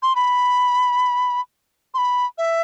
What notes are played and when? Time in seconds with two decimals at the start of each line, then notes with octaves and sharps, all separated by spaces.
0.03 C6
0.16 B5
1.94 C6
1.98 B5
2.38 E5